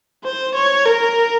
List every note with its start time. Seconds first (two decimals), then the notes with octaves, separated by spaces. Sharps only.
0.24 C5
0.55 C#5
0.86 A#4